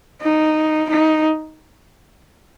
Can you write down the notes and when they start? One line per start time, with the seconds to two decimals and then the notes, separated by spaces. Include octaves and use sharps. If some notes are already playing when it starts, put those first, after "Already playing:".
0.22 D#4
0.89 D#4